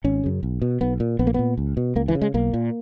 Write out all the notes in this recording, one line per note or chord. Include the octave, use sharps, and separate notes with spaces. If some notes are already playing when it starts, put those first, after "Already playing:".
G#1 C#4
F#2 C#3
B1
B2
B1 B3
A#2
A#1 B3
A#3
A#2 B3
C#2
B2
C#2 A#3
E3
C#3
G#3
B1 A#3
A#2